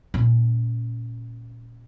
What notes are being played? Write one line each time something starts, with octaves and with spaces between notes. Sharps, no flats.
A#2 C#4